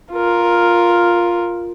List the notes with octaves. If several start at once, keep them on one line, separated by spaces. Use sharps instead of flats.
F4 A#4